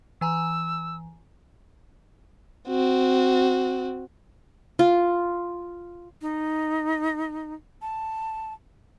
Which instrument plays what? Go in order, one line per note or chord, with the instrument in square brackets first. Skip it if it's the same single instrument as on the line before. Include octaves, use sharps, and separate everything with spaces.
[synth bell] E3 G#5 A#5 [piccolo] E6
[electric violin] C4 F#4
[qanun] F4
[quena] D#4
A5